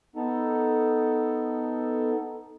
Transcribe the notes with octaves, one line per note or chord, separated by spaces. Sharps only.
B3 D#4 A4